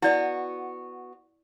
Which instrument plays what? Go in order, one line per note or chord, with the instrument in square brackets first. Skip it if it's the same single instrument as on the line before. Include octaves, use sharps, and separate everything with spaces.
[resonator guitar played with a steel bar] B3 F#4 [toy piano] E4 D5 D#5